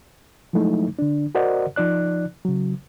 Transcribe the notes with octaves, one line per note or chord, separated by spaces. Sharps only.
F3 F#3 G#3 A3 D#4 E4
D3 D4
F#4 A#4 C5 D5 D#5 F#5
F3 D#4 D5 F#6
C#3 F#3